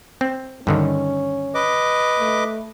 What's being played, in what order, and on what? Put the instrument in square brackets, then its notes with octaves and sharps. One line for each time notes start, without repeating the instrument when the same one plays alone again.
[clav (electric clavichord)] C4
[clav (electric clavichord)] G2 D3 D#3 [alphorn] C#4
[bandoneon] B4 D#5 D6
[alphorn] A3